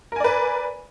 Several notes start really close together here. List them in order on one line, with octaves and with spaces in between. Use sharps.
A#4 G#5 D5 B4